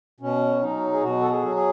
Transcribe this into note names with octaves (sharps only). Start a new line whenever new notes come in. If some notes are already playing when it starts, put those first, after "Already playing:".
B2 C#4
F#3 D#4
G#4
B2 F#4
A4
G#4
F#3
G#4